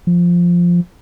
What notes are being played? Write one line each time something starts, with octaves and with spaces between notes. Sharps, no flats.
F3